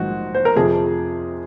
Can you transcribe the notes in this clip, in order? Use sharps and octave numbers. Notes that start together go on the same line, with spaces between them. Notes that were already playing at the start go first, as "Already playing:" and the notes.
Already playing: A#1 G#2 D#3 F#3 F#4
C5
A#4
F2 C3 F3 G#4